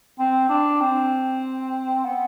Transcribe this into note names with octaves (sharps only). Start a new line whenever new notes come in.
C4
D4
C4
B3